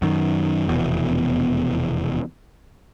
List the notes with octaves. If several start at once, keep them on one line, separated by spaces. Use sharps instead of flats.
F#2 D#3
F1 E2 B2